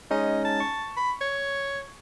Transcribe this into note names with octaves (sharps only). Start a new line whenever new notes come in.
G#3 C#4 D#4 D#5
A5
C#6
B5
C#5